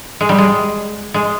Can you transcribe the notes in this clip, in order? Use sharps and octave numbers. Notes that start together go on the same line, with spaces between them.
G#3
G3
G#3
G#3